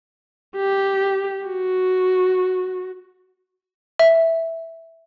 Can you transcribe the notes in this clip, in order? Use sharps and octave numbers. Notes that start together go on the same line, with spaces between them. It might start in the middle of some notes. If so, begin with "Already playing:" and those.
G4
F#4
E5